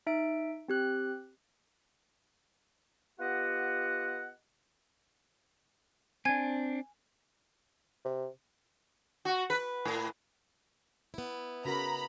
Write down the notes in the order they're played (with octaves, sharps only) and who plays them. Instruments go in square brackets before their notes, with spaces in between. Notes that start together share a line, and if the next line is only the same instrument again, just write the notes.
[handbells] D#4 E5 D7
C4 G4 F#6
[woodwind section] B3 F4 G4 D#5 F#5
[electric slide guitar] C4 D4 [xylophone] G#5 G#6
[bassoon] C3
[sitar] F#4
B4
A2
[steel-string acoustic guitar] B3 E4
[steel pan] C#3 F#4 A#4 [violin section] A#5 B5